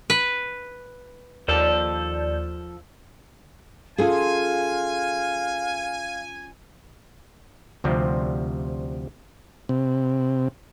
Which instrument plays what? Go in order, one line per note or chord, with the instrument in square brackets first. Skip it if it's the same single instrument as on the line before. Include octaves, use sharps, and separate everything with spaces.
[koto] B4
[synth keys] D#2 D5 G6 [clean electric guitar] F3 A4
[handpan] C#4 F4 [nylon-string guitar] G#4 A4 [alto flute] F5 [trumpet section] G#5
[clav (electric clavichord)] D2 C3 F3 G3 C4
[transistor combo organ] C3